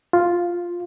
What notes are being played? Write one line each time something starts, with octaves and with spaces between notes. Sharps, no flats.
F4